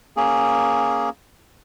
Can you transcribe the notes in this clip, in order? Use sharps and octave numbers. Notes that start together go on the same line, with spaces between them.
A#3 C#4 G#4